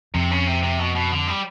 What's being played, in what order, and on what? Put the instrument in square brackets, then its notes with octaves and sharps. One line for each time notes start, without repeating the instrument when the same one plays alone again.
[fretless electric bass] F2 [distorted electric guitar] C3
[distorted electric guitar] C#3
C3
C3
B2
B2
D3
G3